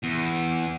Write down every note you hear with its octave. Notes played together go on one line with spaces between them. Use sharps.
E2